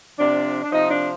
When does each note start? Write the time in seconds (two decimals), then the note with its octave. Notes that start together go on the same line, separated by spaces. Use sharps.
0.19 C3 F3 D4
0.63 D4
0.72 C3 F3 D#4
0.90 D4